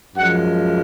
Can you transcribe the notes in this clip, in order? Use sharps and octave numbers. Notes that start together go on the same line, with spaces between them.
F#2 F3 G#3 F#5